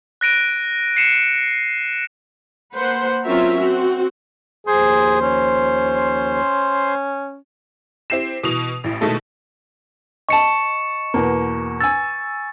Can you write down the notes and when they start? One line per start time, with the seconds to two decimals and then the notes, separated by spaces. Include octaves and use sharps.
0.21 F#6 A#6 D7 D#7
0.96 C7 C#7 D#7 E7
2.73 A#3 B4 C5 F#5
3.24 F#3 C4 C#4 F4 A#4 E5
3.60 C4 F#4
4.67 D#2 F3 G#4 C5 C6
5.22 C#4
8.10 C4 E4 G4 C7 E7
8.43 B2 E3 D#6 F7
8.84 A1 A2
9.01 B2 D#3 G#3 A3 E4 A4
10.29 D#5 A5 C#6 C#7 E7
11.14 E2 B2 A#3
11.81 G#5 E6 A6